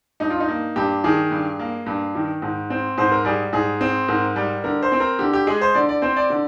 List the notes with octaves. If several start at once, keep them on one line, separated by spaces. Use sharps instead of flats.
G2 D#4
F4
D#4
A#3
G2 G4
D#3 G#4
G2
A#3
G2
D#3
G#2
C4
G#2 C5
A#4
G3 G#4
G#2 G#4
C4
G#2 A#4
G3
D3 A#4
C5
C4
A#4
D3 G4
G4
G#3 G#4
C5
D3 D5
D5
C4 C5
D5
D3